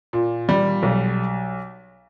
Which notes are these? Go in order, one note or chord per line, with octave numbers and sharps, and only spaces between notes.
A#2
G3
B1